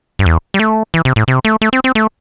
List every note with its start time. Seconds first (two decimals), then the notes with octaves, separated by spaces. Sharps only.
0.19 G2
0.26 E2
0.54 G3
0.59 A3
0.94 E3
1.05 C3
1.16 A2
1.28 C3
1.45 A3
1.62 A3
1.73 C4
1.84 C4
1.95 A3